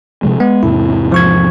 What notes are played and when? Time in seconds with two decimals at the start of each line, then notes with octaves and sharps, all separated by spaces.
0.23 C3 F3 G#3
0.40 G#3 B3
0.63 E2 G#2 C3 E4
1.12 F3 C#6 G#6